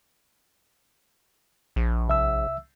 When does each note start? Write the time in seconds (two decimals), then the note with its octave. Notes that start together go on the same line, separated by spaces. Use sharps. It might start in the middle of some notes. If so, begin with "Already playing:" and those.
1.76 A#1
2.08 C2 E5 E6